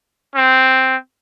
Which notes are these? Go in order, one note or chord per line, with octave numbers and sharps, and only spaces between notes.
C4